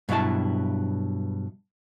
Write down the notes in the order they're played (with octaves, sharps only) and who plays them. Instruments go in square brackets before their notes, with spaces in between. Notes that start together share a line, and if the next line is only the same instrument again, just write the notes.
[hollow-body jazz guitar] G2 B2 F#3 E4 A5